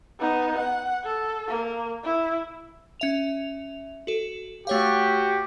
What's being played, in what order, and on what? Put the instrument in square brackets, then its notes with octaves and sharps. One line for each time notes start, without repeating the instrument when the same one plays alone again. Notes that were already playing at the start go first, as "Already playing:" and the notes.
[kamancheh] B3 D#4
F#5
A4
A#3
E4
[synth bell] C#4 E5 F7
F#4 A4
[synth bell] A3 C#5 F5 [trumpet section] F#4 G4